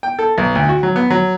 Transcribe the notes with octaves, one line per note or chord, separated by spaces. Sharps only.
G5
A4
B1
D2
F#4
F#3
B3
F#3